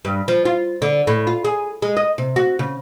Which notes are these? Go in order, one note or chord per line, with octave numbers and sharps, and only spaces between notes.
G2
F3
F4
D3
A2
F4
G#4
G#3
D#5
C3
F#4
C#3